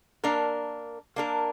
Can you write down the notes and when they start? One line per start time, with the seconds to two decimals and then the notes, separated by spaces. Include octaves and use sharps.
0.24 A#3 D4 A#4
1.16 A#3 D4 A#4